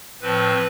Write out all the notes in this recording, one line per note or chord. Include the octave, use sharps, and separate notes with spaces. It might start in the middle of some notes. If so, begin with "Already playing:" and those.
A2 F3 C4 B4